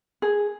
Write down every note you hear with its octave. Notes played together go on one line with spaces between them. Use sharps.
G#4